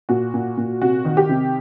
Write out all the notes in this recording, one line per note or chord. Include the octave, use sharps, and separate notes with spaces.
A#2 F#4
A#2
A#2
C3 F#4
D#3
G4
C3